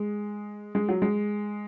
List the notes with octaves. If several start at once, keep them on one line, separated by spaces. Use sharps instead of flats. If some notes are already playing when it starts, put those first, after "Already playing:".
Already playing: G#3
G#3
F#3
G#3